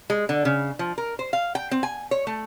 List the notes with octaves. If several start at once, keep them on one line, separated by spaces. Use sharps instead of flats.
G#3
D3
C#3
F3
A#4
C5
F5
G5
C4
G#5
C#5
A3